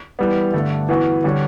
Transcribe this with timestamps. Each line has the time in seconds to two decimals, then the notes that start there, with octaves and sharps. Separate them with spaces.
0.19 E3 G3 B3
0.53 G2 D3 A3
0.89 E3 B3 F#4
1.24 D3 G3 C#4